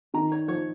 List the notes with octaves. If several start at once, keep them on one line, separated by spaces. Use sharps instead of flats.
D#3 A#5
C#5
F3 C#5